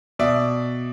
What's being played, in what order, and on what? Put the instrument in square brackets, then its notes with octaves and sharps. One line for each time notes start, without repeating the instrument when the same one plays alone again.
[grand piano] B2 D5 E5